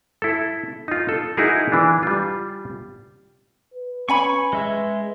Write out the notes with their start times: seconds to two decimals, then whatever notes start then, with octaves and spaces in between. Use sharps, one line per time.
0.22 E4 A4
0.88 D#4 F4
1.09 A4
1.37 D#4 E4 F#4 G#4 A#4
1.72 E3 D4
2.03 G3 F4
3.74 B4
4.09 C#4 G#5 B5 C#6
4.53 G#3 E5